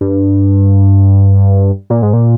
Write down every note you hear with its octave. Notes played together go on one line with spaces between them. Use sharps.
G2
A#2
G#2
A#2